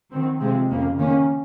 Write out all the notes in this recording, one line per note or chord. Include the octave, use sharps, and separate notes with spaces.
D#3 F#3 C4
C3 F3 G#3 C4
F2 C#3 F3 A#3
D#3 A#3 C#4